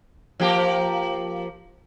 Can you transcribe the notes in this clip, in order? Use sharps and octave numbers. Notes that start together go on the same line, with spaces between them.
F3 A#3 G4